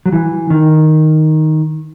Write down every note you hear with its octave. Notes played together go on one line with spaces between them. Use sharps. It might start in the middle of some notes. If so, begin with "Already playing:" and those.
F#3
E3
D#3